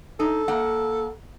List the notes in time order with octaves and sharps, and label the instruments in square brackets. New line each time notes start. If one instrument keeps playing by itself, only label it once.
[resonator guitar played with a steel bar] D#4 [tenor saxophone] A4
[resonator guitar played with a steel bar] A#3 F#5